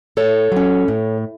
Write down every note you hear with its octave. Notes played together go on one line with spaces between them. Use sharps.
A2 A4 C#5
F#3 C#4
A2